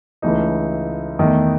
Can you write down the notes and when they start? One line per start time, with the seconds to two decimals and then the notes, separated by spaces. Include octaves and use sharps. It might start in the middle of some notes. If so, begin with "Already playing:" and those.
0.22 C#2 C#3 E3 A3 D#4
1.19 E2 D#3 A3 D#4